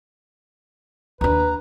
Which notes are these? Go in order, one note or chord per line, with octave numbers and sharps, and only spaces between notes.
D#2 D4 B4 A#5